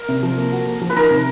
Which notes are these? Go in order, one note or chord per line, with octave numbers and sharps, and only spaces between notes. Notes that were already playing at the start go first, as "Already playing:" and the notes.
Already playing: A#4
C3
F3
A#3
F#4
A#3
F3
B4
D#3 A#4
C3